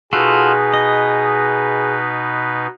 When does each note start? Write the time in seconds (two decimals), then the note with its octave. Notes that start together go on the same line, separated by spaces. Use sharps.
0.13 B2 D#4 F4 F#4 G#4 A4 B4
0.74 D#5